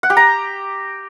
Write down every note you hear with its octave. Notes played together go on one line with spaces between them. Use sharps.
F#5
G4
A#5